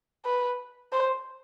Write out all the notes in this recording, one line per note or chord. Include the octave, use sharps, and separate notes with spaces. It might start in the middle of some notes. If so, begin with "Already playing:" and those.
B4
C5